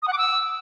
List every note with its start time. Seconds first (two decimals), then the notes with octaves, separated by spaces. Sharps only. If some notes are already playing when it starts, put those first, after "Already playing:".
0.02 D#6
0.07 F#5
0.13 D6
0.18 E6